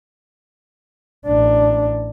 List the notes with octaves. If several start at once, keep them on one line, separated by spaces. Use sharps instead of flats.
A1 D4